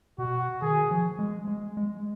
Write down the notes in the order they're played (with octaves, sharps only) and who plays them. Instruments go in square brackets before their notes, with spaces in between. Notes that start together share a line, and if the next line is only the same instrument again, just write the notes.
[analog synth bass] B2 [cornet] F#4
[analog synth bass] D#3 [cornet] G#4
[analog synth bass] F3
G#3
G#3
G#3